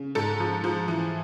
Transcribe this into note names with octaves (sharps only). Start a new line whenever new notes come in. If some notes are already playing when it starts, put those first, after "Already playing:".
Already playing: C#3
G#2 A4
F3
F3
E3